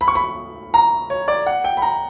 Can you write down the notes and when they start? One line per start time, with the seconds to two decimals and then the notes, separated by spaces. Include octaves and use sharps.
0.01 B5
0.08 C#6
0.15 B5
0.74 A#5
1.10 C#5
1.28 D5
1.46 F#5
1.64 G5
1.77 B5
1.82 A#5